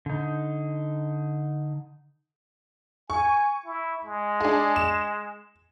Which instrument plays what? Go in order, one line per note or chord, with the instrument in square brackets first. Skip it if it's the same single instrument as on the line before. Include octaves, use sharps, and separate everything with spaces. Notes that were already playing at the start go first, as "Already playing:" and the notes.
[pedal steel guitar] D3 D#4
[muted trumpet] G#5 [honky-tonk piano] C#6
[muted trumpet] E4
G#3
[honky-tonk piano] D4 G#4
E7